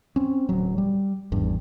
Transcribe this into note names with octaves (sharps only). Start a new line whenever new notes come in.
C4 C#4
D1 F#3
G3
G#1 E2 G2